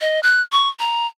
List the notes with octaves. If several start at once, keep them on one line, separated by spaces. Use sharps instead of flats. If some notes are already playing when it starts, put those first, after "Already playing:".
D#5
F#6
C#6
A#5